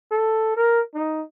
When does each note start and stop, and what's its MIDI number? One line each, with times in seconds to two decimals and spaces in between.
0.11 0.55 69
0.57 0.80 70
0.95 1.22 63